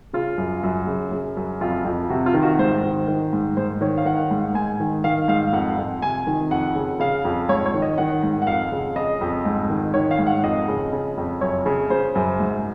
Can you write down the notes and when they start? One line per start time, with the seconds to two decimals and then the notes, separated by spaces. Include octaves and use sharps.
0.13 C#3 F4
0.38 F#2
0.63 F#2
0.87 C#3
1.12 C#3
1.37 F#2
1.61 F2 F4
1.85 F2
2.09 C3 F#4
2.26 F4
2.34 D#3
2.42 F#4
2.58 G#2 C5
2.83 D#3
3.08 D#3
3.33 G#2
3.57 G#2 C5
3.81 D#3 C#5
3.97 F5
4.05 D#3 F#5
4.31 G#2
4.54 G#2 G#5
4.80 D#3
5.04 D#3 F5
5.28 G#2 F5
5.53 F2 F#5
5.77 F2
6.02 C3 G#5
6.27 D#3
6.51 F2 F#5
6.75 C#3
7.00 C#3 F5
7.25 F2
7.49 G#2 C#5
7.66 C#5
7.74 D#3
7.82 D#5
7.98 D#3 F#5
8.23 G#2
8.42 F#5
8.47 F2 F5
8.72 C#3
8.96 C#3 D#5
9.21 F2
9.45 G#2
9.70 D#3
9.94 D#3 C#5
10.11 F5
10.19 G#2
10.27 F#5
10.43 F2 D#5
10.68 C#3
10.93 C#3
11.17 F2
11.41 F#2 C#5
11.66 C#3
11.90 C#3 C5
12.15 F#2
12.40 G#2